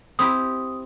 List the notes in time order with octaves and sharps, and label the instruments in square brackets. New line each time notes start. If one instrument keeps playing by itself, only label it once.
[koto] C4 E4 G4 [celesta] D#6